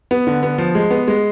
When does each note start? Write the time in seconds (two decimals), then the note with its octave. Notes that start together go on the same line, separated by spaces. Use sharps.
0.11 B3
0.27 D3
0.43 B3
0.58 F3
0.75 G#3
0.91 B3
1.08 G#3